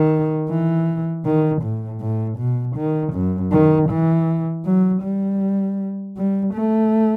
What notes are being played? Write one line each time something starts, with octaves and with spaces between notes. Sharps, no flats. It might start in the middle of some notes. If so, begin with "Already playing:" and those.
Already playing: D#3
E3
D#3
A2
A2
B2
D#3
F#2
D#3
E3
F#3
G3
G3
A3